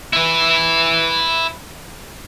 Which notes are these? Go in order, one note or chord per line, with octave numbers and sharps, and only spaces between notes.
E4 B4